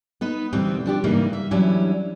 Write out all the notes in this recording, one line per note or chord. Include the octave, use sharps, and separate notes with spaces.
B3 D#4 B4
D2 B2 E3 G3 B3 C4
F3 D4 G4
G#2 C#3 E3 G3 A#3 D#4
E5
E3 F#3 G3 C#4 D4 E4